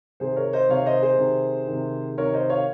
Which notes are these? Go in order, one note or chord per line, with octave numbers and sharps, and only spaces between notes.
C3 D#3 G#4 C5
A#4 C#5
C5 D#5
C3 D#3 C#5 F5
C5 D#5
G#4 C5
C3 D#3
C3 D#3
C3 D#3 A#4 C#5
C5 D#5
C#5 F5